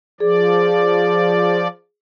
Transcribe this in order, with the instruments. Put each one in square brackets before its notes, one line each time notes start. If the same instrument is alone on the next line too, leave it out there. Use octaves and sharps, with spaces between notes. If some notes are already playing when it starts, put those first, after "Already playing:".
[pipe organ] F3 D5 [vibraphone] G#4